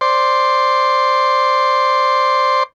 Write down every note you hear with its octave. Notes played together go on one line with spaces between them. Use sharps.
C5 D5 C6